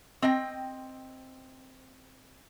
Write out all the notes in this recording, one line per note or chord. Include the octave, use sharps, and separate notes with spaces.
C4 D#5 G5